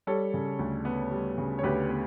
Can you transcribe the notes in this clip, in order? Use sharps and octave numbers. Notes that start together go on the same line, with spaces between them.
G3 A4 C#5
C#3
D2
B3
G3
C#3
C#5
D2 G4 B4
B3